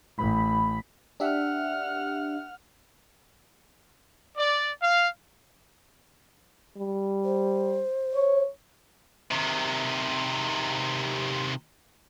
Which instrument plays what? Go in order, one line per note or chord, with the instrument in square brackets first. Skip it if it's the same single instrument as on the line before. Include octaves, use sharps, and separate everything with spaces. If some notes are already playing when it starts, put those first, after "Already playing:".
[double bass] A1 [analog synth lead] B5
[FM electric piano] D4 G4 E5 [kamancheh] F#5 F6
[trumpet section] D5
F5
[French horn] G3
[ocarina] C5
[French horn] C#5
[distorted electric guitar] C3 D#3